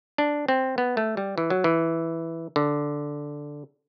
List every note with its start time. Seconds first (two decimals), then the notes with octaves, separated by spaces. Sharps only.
0.18 D4
0.48 C4
0.78 B3
0.97 A3
1.17 G3
1.38 E3
1.50 F#3
1.64 E3
2.56 D3